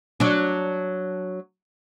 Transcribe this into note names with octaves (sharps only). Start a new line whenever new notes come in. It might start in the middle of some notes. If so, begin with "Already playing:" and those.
F#3 D4